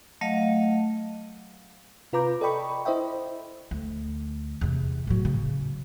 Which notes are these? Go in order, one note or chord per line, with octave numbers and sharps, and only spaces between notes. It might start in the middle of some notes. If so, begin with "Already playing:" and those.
F#3 A3 D#5 F5
C3 F4 B4 A#5 D6 G6
A4 D5 D#5 G5 B5 C#6
E4 C5 D#5 E5 G5
D2
E2 C3
A2 F#3
C#3